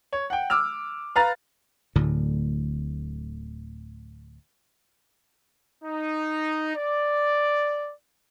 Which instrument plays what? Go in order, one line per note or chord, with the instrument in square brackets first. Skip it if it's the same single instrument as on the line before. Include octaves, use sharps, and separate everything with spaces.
[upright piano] C#5
F#5 G5
D6 E6 F6
B4 F5 A#5 A6
[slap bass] D1 D2 A2 D3
[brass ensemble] D#4
D5